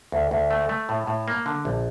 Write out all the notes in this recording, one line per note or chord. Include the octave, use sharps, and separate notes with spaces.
D2
D2
A3
A3
A2
A2
A#3
D3
A#1